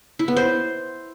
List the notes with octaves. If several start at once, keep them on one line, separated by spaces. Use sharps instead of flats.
E4
B3
C5